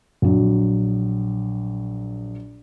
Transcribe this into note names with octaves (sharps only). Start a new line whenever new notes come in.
A#1 F#3